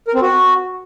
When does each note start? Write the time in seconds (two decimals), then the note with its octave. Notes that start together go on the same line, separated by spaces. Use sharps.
0.08 A#4
0.15 C4
0.22 F#4